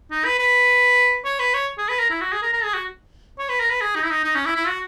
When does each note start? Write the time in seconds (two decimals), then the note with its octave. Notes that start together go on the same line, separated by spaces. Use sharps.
0.11 D#4
0.25 B4
0.39 B4
1.25 C#5
1.39 B4
1.54 C#5
1.78 G#4
1.89 B4
2.00 A#4
2.10 E4
2.21 F#4
2.32 G#4
2.43 A#4
2.53 A#4
2.64 G#4
2.74 F#4
3.39 C#5
3.49 B4
3.60 A#4
3.70 B4
3.81 G#4
3.95 D#4
4.03 E4
4.10 D#4
4.24 D#4
4.35 C#4
4.46 E4
4.56 E4
4.67 F#4